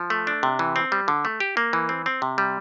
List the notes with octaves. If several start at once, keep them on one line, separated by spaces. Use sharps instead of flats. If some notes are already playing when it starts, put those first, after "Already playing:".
Already playing: F3
A3
D4
C3
E3
C4
G3
D3
A3
G4
A#3
E3
C4
C4
C3
G3